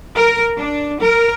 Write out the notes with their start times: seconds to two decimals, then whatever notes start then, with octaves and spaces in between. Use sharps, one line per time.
0.17 A#4
0.55 D4
1.00 A#4